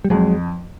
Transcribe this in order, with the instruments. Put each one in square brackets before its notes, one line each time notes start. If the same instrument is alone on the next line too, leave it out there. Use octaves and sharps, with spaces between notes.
[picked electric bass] G3
[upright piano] F2 [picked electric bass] F#3 G#3